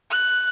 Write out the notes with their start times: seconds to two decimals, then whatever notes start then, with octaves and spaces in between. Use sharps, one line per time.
0.10 F#6